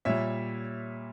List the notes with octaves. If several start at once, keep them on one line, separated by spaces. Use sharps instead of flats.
A#2 G3 C#5 E5